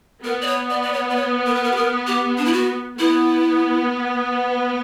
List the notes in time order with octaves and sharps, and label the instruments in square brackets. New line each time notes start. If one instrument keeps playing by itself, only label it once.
[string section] B3 [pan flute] A#4
[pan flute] D5
C#5
D5
D5
C#5
D5
C#5
A#4
B4
A#4
G4
A#4
G4
D4
E4
F#4
[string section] B3 [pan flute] E4